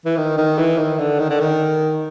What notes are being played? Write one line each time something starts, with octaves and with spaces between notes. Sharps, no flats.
E3
D#3
D#3
E3
D#3
D3
D#3
D3
D#3